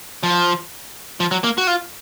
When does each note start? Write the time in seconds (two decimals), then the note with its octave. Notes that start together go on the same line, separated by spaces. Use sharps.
0.23 F3
1.20 F3
1.31 F#3
1.44 A#3
1.58 F#4
1.67 F4